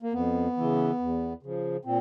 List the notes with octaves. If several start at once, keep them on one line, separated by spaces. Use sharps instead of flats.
A#3
F2 B3
C#3 E3
E2
C#3 F3
A#2 C4